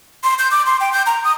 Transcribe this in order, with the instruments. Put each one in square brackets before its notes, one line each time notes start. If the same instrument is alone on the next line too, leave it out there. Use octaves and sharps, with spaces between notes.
[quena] C6
G6
D6
C6
G5
G6
A#5
D#6